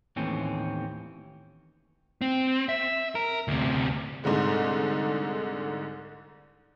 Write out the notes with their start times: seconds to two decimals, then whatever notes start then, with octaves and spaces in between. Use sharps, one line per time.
0.16 D#2 A2 E3 C4 C#4
2.21 C4
2.69 E5
3.15 A#4
3.48 D2 C3
4.24 C2 G#2 D3 G#3